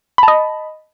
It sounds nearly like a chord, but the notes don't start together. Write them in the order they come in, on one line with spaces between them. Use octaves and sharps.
B5 A5 D#5